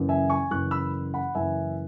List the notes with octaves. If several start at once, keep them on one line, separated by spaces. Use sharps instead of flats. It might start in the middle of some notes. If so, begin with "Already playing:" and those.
Already playing: F#1 F#2 E3
E5 G#5
G#5 C#6
F#1 F#2 E3 C#6 F#6
B5 E6
F#5 B5
F#1 F#2 E3 E5 G#5